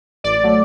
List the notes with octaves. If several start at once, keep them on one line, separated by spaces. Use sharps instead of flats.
A1 D5
F#3 A3